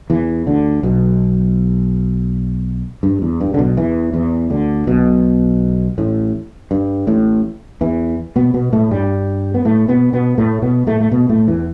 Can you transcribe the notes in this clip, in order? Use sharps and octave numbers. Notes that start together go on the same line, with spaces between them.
E2 E3
D2 D3
B1 B2
G2
E2
G2
D3
B1 B2
E2 E3
E2 E3
D2 D3
B1 B2
A1 A2
G2
A1 A2
E2 E3
B2 B3
B2 B3
A2 A3
G2 G3
B3
A2 A3
B2 B3
B2 B3
A2 A3
B2 B3
A2 A3
A3
B2 B3
A2 A3
E2 E3